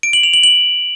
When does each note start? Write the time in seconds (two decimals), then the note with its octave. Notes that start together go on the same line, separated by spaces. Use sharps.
0.03 D7
0.13 F#7
0.23 F7
0.33 F#7
0.44 F#7